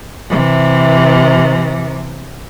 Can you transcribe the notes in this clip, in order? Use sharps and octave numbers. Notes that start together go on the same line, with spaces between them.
C3 E3